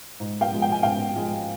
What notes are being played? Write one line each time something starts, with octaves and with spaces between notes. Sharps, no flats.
G#2
F5 G5
F3 G#3
G5
G#5
G#2 F5 G5
F3 G#3